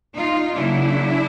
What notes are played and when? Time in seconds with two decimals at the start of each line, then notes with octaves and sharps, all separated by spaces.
0.16 D#4 F4
0.55 C#3 F#3 A#3 D4 E4